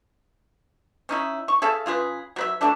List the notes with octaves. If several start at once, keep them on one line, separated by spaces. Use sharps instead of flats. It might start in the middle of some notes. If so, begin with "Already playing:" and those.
C#4 D#4 E4
C#6
G#4 A4 E5 F5
C#3 F4 G#4 B4
F#3 B4 E5
F#3 A3 D4 A4